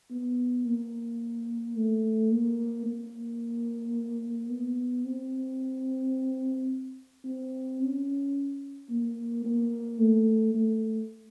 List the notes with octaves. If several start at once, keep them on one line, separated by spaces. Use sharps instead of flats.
B3
A#3
A3
A#3
A#3
B3
C4
C4
C#4
A#3
A#3
A3
A3